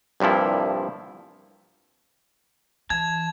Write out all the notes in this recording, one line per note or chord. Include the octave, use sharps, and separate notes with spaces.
C2 G2 A#2 F3 E4
E3 A5 G#6